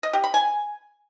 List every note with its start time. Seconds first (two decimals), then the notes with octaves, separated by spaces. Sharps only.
0.03 D#5
0.13 G4
0.24 B5
0.34 G#5